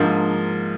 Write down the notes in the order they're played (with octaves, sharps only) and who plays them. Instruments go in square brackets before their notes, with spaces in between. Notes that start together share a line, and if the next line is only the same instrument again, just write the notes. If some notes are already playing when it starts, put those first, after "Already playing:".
Already playing: [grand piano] G#2 F3 A#3 [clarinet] D4